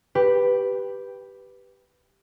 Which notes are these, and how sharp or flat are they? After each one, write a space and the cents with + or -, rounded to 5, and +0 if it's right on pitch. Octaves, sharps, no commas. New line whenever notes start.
G4 +0 B4 +0